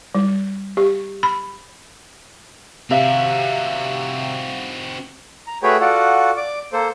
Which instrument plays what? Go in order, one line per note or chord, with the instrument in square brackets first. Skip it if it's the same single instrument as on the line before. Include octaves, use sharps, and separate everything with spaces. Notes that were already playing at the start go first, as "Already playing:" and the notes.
[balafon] G3
G4
B5
[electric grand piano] C3 E5 [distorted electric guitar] C4 F#4 [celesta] F5
[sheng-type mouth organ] A#5
A3 F#4 G#4 B4 C#5 G5
F4 F#4 A4 D5 F#5
D5 D6
A#3 A4 C5